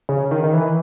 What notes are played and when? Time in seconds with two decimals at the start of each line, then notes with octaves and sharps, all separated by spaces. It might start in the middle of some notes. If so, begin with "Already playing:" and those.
0.09 C#3
0.31 D#3
0.44 D#3
0.53 E3